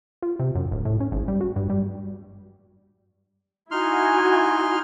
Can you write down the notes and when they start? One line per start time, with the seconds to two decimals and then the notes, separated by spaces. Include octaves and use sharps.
0.22 F4
0.39 C3
0.55 F#2
0.71 D1
0.85 A2
1.00 C#4
1.12 G#1
1.28 G3
1.41 F#4
1.56 G2
1.70 G3
3.71 D#4 E4 F#4 G#5 C6 F6